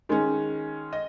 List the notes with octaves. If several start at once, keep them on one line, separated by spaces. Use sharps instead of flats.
D#3 G#3 C#4
D#5